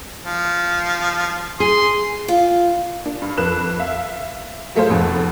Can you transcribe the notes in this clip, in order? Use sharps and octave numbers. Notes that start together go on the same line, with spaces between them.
F3
G#4 C6
F4
D4
G2
F2 B4 F#6 E7
E5 F5
F#3 A3 F4 G#4 C5
F1 F2 B2 D#4